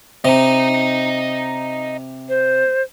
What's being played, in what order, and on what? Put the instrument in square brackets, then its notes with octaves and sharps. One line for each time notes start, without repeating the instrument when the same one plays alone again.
[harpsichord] C3 [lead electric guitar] D#5 A#5
[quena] C5